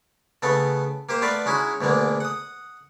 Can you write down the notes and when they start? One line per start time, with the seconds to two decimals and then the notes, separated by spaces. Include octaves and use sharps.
0.42 C#3 A3 B3 A4
1.09 A#3 G4 C5
1.22 A3 B3 F4 B4 D5 F5
1.46 G#3 C#4 D#4 E4 F#4
1.81 D2 B2 D3 G#3 A#3
2.20 F#5 D#6